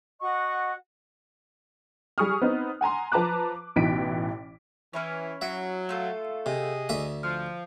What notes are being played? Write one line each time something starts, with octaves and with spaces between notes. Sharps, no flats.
F#4 D#5 F#5 C#6
G3 G#4 C#6 D#6 F6
B3 C4 D#4
F#5 G#5 A#5 C6
F3 B4 A5 A#5 D6 F#6
A1 B2 E3 D#4 B6 D7
E3 C#4 E4 C#5
F#3 E5
A3 F4 A4
C3 G#4 D#5
D2 E5 D#6
F3 F6